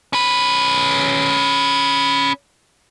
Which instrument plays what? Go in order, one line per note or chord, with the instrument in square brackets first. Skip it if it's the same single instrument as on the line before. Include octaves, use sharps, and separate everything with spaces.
[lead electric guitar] C#4 B4